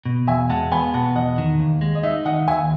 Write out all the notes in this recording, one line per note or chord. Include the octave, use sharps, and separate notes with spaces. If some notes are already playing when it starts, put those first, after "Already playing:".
B2
E2 E5 G#5
G#3 F#5 A5
B3 G#5 B5
B2 F#5 A5
E2 D#5 F#5
D#3
D#2
G#3
D#5
D#4 E5
D#3 D#5 F#5
D#2 E5 G#5